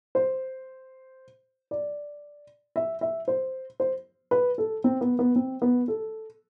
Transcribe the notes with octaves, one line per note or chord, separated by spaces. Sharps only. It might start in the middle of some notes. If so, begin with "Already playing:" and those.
C5
D5
E5
E5
C5
C5
B4
A4
C4
B3
B3
C4
B3
A4